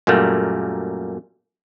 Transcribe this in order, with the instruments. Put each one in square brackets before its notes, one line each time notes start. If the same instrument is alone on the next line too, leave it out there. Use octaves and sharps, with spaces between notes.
[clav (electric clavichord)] F#2 A#2 G3 A3 A#3